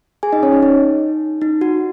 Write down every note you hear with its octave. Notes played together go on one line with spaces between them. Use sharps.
G#4 G#5
D#4 D#5
C#4 C#5
D#4
D#4
D#4
F#4